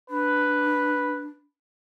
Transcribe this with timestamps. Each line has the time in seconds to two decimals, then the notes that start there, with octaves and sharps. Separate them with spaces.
0.10 D4 B4